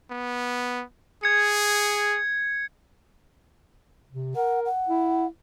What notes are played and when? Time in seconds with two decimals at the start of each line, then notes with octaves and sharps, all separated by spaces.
0.11 B3
1.23 G#4 G#6 C#7
4.12 C3
4.36 A#4 F#5
4.66 F#5
4.89 E4